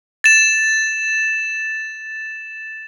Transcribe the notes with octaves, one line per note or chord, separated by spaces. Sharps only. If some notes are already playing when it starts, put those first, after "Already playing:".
A6 E7